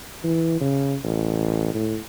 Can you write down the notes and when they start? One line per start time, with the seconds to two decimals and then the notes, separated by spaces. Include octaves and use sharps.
0.24 E3
0.61 C#3
1.04 A1
1.74 A2